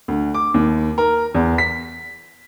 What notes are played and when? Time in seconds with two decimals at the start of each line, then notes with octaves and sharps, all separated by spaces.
0.08 D2
0.34 D6
0.54 D#2
0.98 A#4
1.35 E2
1.58 B6